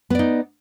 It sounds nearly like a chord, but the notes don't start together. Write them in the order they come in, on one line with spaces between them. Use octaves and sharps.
B3 D5 D#4